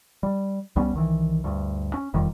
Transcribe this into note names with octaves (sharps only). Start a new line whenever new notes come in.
G3
C2 G3 B3 C#4
C2 D#3 E3
D2 G2
C#4
E1 F2 D#3 G3